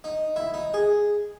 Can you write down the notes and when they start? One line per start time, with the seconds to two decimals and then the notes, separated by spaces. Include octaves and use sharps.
0.04 D#4
0.36 E4
0.54 D#4
0.74 G#4